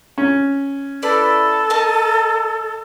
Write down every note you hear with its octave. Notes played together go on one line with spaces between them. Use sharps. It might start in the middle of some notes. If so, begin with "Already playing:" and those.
C#4
E4 A4 B4 D5
A#4 D#5 A5